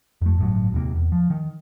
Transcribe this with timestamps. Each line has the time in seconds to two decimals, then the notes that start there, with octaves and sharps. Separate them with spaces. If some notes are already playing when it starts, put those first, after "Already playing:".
0.21 F2 A3
0.38 G1 A2 F#3
0.72 D#1 D#2 C3 A#3
0.94 E2
1.12 F3
1.30 D#3